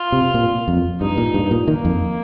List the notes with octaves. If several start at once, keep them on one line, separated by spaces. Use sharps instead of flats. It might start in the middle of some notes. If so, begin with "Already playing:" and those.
Already playing: F4
C3
A#2
F2
G2 D#4
A#2
G2
A#2
D#3 A#3
F2